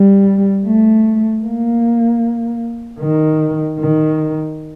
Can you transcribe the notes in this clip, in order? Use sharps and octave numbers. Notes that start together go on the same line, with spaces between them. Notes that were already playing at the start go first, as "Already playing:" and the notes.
Already playing: G3
A3
A#3
D#3
D#3